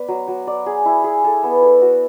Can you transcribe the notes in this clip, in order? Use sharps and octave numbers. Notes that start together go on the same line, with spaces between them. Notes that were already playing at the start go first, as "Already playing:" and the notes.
Already playing: B3 B4 D5
F#3
F#3
D5
G#4
E4
G#4
A4
B3
A4
F#4